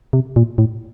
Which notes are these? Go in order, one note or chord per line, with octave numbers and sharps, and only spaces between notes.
C3
A#2
A2